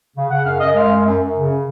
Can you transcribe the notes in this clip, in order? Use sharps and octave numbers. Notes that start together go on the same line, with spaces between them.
C#3
C#3 F#5
F#2 F5
F#2 D#5
G#3 F5
F#2
F#2
F#2
C#3